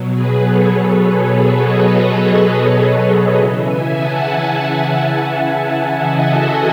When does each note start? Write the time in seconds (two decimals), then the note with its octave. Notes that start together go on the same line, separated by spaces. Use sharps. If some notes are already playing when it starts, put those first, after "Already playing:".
Already playing: B2 F#3
0.12 G#4 B4
0.41 A4 C#5
1.58 B4 D#5
3.34 C#3 E3 C#5 E5
3.63 E5 G#5
3.93 F#5 A5
4.22 E5 G#5
5.98 D#5 F#5
6.27 F#4 A4